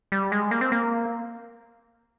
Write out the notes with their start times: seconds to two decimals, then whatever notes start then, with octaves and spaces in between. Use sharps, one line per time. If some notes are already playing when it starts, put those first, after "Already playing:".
0.12 G3
0.32 G#3
0.51 A#3
0.61 C4
0.72 A#3